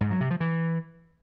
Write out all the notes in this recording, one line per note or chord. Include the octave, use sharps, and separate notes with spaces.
G#2
F#3
C3
F3
E3